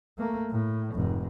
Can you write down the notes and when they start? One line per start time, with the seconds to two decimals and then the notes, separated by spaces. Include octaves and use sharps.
0.18 A3 A#3
0.50 A2
0.94 F1 G#2